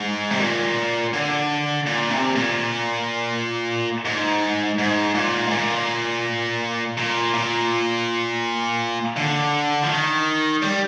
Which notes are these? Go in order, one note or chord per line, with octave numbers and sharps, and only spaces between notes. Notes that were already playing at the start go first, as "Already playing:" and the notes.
Already playing: G#2
C3
A#2
D3
A#2
C3
A#2
G#2
G#2
A#2
G#2
A#2
A#2
A#2
D3
F3
D#3
G3